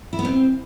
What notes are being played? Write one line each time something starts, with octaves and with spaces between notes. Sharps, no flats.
E4
B3
C4